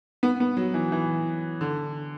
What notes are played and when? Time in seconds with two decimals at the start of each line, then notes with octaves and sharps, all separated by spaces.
0.23 B3
0.40 B3
0.57 F#3
0.74 E3
0.92 E3
1.61 D3